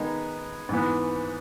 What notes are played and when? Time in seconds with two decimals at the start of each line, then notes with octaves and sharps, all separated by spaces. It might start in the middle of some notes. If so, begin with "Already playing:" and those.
Already playing: D#3 G#3 B3 D#4
0.69 G#2 E3 B3